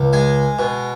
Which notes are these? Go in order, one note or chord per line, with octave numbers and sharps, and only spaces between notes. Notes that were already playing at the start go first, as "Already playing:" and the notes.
Already playing: C#2
G#3 G#5
B2